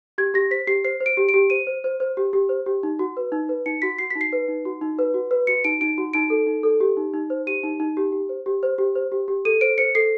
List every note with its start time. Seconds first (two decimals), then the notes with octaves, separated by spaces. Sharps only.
0.18 G4 G#6
0.34 G4 A#6
0.51 C5 B6
0.67 G4 C7
0.84 C5 C7
1.00 C5
1.06 D7
1.17 G4
1.29 D7
1.34 G4
1.50 C5 D#7
1.67 C5
1.84 C5
2.00 C5
2.17 G4
2.33 G4
2.49 C5
2.66 G4
2.83 D#4
2.99 F#4
3.17 B4
3.32 D#4
3.49 B4
3.66 D#4 C#7
3.82 F#4 B6
3.99 F#4 C7
4.10 D#4 B6
4.21 C7
4.32 B4
4.48 D#4
4.65 F#4
4.81 D#4
4.99 B4
5.14 F#4
5.31 B4
5.47 F#4 C#7
5.64 D#4 D7
5.81 D#4 D7
5.98 F#4
6.13 D#4 D7
6.30 A4
6.47 D#4
6.63 A4
6.80 G4
6.97 D#4
7.14 D#4
7.30 C5
7.47 G4 D#7
7.63 D#4
7.80 D#4
7.97 G4
8.12 G4
8.29 C5
8.46 G4
8.63 C5
8.78 G4
8.95 C5
9.12 G4
9.28 G4
9.45 A4 D#7
9.61 C5 D7
9.78 C5 C#7
9.95 A4 C7